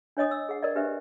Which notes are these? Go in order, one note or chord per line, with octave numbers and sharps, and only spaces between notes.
D4 C#5 D#5 D#6
E6
G#4 F#5
A#4 D5 D#5
D4 G4 B4 C5 E5